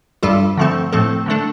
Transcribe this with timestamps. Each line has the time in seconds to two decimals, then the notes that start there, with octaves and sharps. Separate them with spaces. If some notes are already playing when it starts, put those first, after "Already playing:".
0.23 G2 G3 F4 A4
0.57 D3 F3 A3 C4 A4
0.93 A2 F3 A3 C4 A4
1.26 D3 A3 D4 A4